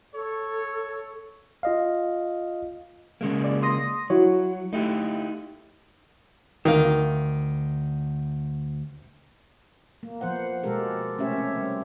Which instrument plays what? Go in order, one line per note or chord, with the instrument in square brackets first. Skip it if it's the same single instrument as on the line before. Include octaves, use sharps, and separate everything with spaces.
[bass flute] A4 [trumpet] C#5
[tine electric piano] F4 D#5 F5
[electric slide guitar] C#3 G#3 A#3
[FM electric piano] D5
C6 D#6 A#6
[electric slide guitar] F#3 [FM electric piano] E4 F#4 C#5
[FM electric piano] A3 [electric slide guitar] D#4 E4 G4
[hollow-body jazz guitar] D2 F5 [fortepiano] D#3
[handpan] A#3
F3 B3 C5 F#5
B2 G#3 G4 A4 A#4
C3 A3 C#4 G4 C#5 E5
C4
G3